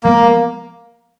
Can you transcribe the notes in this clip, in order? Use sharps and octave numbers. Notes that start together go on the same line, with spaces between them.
F3 G#3 A#3 B3